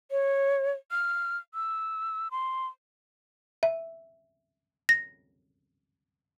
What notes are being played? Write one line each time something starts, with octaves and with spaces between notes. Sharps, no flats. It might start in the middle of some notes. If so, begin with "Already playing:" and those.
C#5
F6
E6
C6
E5
A#6